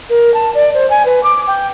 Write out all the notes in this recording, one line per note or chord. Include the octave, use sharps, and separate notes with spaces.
A#4
A5
D5
C5
G#5
B4
D6
G5